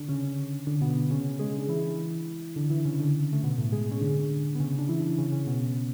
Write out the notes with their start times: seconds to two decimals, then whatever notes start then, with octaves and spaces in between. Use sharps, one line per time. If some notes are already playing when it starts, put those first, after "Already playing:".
Already playing: D3 D4
0.09 C#3 C#4
0.67 D3 D4
0.81 B2 B3
1.10 C#3 C#4
1.39 G#3 G#4
1.58 D4
1.69 E3 E4
2.56 D3 D4
2.70 E3 E4
2.85 C#3 C#4
3.00 D3 D4
3.33 A3
3.43 B2 B3
3.57 A2 A3
3.72 G#3 G#4
3.91 C#4
4.01 D3 D4
4.55 B3
4.60 C#3 C#4
4.79 D4
4.89 E3 E4
5.18 C#3 C#4
5.32 C#3 C#4
5.47 B2 B3